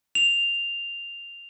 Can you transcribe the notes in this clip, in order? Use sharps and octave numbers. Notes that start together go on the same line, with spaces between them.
F7